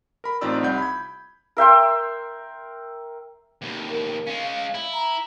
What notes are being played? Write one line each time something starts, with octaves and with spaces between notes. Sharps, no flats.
A#4 B5
A1 C4 D#4 F4 D5 E6
C2 F#5 B5 G6
B5 G#6
A#4 E5 G5 C6
D#2 B2
A#4
G#3 C#4 F5
E4
A#5